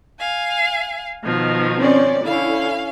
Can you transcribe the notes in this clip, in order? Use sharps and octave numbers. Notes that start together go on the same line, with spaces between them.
F5 G#5
B2 D#3 F3
C4 C#4 D5
D3 C#4 E4 F5